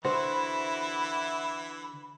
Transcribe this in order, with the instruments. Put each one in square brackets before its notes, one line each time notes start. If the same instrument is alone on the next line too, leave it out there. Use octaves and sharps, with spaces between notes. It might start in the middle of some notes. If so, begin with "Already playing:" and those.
[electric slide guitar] D3 F#4 [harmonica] E3 E4 [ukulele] C5 [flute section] B5